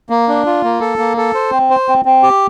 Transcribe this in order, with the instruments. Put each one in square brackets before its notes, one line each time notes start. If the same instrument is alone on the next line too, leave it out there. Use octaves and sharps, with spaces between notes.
[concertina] A#3
D4
F4
A#3
A4
A#3
A4
C5
C4
C5
C4
C4
G4